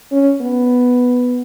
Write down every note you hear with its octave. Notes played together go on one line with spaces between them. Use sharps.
C#4
B3